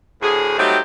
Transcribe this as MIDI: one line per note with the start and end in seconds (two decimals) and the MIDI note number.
0.22 0.57 38
0.22 0.57 45
0.22 0.57 66
0.22 0.57 68
0.58 0.77 54
0.58 0.77 55
0.58 0.77 57
0.58 0.77 60
0.58 0.77 63
0.58 0.77 67